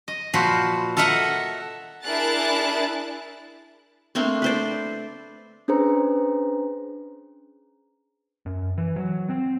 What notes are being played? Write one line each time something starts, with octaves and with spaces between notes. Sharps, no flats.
D#5
A#2 F3 F#4 B4 C5
A4 A#4 D#5 E5 F#5
D4 E4 G#4 A#4 F#6 A6
A3 A#3 C4 D4
B4 C5 D5
C#4 D4 G#4 B4 C5 A#5
F#2
E3
F#3
C4